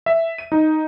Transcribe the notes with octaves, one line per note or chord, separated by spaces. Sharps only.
E5
D#7
D#4